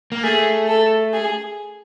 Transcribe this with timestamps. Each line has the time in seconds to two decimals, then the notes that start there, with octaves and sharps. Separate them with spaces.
0.12 A#3
0.24 A3 G#4
0.68 A4
1.13 G#4